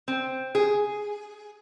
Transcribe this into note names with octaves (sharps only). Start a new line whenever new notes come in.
C4
G#4